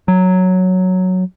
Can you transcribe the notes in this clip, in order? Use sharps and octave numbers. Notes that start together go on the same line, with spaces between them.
F#3